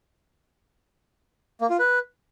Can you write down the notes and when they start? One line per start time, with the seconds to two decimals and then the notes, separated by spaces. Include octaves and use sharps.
1.61 A#3
1.70 F4
1.79 B4